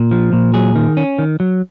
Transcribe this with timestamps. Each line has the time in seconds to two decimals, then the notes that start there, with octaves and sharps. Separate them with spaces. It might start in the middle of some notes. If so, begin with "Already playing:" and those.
Already playing: A#2
0.11 F3
0.33 A#2
0.54 F#3 G#4
0.76 D#3
0.97 C#4
1.19 D#3
1.40 F#3